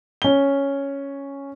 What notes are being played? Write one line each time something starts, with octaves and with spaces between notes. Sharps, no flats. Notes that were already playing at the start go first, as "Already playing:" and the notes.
C#4 G7